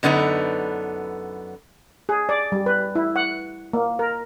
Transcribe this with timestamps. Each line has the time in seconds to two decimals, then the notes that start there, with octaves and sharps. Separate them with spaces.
0.03 F#2 D3 B3 D#4 B4
2.09 G#4
2.29 D5
2.52 G3
2.66 B4
2.95 E4
3.16 F#5
3.73 A#3
3.99 A#4